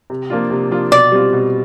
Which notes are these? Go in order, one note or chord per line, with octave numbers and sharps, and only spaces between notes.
C3
F3 A#3 D4 F4
C3
F3 A#3 D4 F4
B2 D5
G3 C4 F4
B2